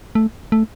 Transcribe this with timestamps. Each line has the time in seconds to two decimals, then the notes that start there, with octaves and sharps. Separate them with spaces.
0.15 A3
0.52 A3